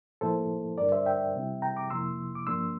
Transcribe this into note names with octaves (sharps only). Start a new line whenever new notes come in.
A2 F3 A#3 E4 A4 C5
G2 D3 G3 D4 A#4 D5
C5 E5
E5 G5
C3 G3 C4 E4
G5 A#5
A#5 D6
F2 C3 F3 A#3 E4 C6 E6
D6
G2 F3 A#3 D4 C6 E6